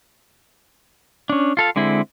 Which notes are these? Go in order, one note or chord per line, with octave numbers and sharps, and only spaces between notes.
C#4 D4
F4 A4 F5
D3 G#3 C4 E4